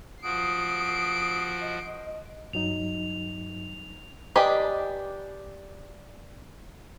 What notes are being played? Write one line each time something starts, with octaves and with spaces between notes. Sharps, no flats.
F3 F#4 D#6 C7 D7
D#5
G2 F#3 D#4 F7
D4 G4 B4 D#5 G#5